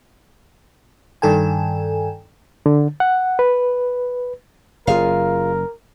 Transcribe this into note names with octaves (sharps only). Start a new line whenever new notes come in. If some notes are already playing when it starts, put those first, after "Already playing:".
G2 D#3 A4 G5 G#5
D3
F#5
B4
F#1 F4 G#4 A#4 F5